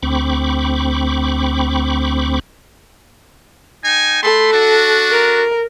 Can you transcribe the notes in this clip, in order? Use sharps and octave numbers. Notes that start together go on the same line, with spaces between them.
D2 C4 B5 C#6 D6
D#4 G5 G#5
A3 A4 B5 C6
D4 F#4
A#4